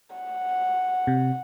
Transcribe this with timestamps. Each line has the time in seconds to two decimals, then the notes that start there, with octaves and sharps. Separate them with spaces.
0.15 F#5
1.07 C3